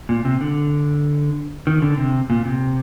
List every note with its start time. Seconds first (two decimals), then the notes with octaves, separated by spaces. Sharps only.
0.09 A#2
0.25 C3
0.41 D3
1.67 D#3
1.82 D3
1.97 C3
2.30 A#2
2.45 C3